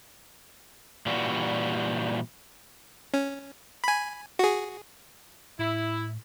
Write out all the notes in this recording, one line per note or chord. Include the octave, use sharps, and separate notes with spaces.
A#2 E3 G3 F#4
C#4
G#5 B5
F#4 G#4
A2 E4